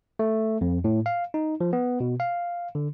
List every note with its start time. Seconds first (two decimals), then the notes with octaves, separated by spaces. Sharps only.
0.19 A3
0.61 F2
0.84 A2
1.06 F5
1.34 D#4
1.61 F3
1.73 B3
2.00 B2
2.20 F5
2.75 D3